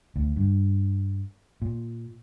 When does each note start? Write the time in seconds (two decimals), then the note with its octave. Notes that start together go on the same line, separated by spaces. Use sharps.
0.16 D2
0.36 G2
1.62 A#2